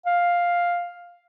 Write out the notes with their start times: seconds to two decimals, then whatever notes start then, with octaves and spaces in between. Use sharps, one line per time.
0.06 F5